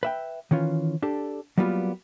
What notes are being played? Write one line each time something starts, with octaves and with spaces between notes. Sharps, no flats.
B4 E5 G5
D#3 E3 C#4 F4
D4 G4 A4
F#3 G3 A#3 B3 D4 F4